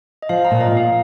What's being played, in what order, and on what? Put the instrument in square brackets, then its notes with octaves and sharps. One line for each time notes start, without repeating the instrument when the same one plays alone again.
[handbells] D#5
[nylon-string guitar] F3 [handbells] F5
[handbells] A#5
[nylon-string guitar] A#2
[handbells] D#5
[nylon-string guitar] A#2
[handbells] F5